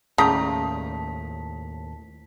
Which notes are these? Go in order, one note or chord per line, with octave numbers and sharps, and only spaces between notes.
D#2 A2 C#3 D5 G5 A5 A#5 B6